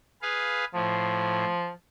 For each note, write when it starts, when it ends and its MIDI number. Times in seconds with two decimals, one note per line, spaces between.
0.22 0.65 68
0.22 0.65 71
0.22 0.65 77
0.74 1.45 45
0.74 1.71 53